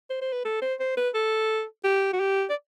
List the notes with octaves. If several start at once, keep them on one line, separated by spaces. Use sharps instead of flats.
C5
C5
B4
A4
C5
C5
B4
A4
G4
F#4
G4
D5